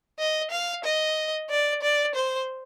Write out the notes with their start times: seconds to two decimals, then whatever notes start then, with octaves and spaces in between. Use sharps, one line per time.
0.19 D#5
0.51 F5
0.84 D#5
1.50 D5
1.82 D5
2.15 C5